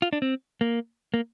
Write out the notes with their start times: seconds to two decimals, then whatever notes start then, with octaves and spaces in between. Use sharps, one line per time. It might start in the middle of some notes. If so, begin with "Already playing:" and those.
0.02 F4
0.13 D4
0.22 C4
0.61 A#3
1.14 A#3